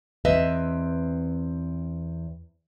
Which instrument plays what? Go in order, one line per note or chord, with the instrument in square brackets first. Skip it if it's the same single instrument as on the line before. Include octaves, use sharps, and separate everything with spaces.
[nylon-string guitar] E2 C4 B4 D#5 E5